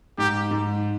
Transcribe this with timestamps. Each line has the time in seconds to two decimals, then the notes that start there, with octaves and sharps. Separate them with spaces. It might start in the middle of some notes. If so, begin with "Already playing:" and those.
0.18 G#2 G4
0.51 G#2